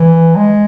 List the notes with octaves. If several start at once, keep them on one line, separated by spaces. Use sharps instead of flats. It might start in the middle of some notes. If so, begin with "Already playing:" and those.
Already playing: E3
G#3